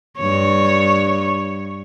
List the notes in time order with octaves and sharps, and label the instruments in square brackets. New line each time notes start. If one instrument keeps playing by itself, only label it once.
[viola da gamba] G2 C#5